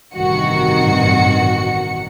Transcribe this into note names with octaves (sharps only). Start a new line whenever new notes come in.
A1 G2 C3 D#3 F#4 C#7